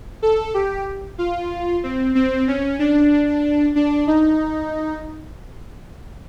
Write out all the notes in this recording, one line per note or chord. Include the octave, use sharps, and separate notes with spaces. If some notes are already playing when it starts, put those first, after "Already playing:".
A4
G4
F4
C4
C4
C#4
D4
D4
D#4